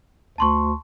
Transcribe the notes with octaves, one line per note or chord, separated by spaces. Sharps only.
D2 A5 C6 C#6